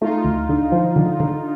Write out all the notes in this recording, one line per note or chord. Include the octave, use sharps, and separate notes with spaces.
A3 D#4 F4
D2
D3
F3
D3
D3